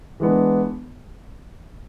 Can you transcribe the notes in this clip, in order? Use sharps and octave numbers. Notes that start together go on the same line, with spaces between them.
E3 G#3 B3 D4